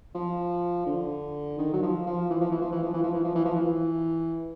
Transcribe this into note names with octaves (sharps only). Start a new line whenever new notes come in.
F3
D3
D#3
F#3
F3
F3
E3
F3
E3
F3
E3
F3
E3
F3
E3
F3
E3
F3
E3